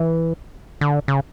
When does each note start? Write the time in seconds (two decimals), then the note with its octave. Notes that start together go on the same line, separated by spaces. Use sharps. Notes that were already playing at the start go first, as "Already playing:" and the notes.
Already playing: E3
0.81 D3
1.08 C#3